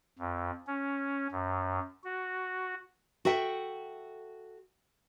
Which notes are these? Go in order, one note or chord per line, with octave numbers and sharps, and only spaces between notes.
F2
C#4
F#2
F#4
F#4 A4 E5 G5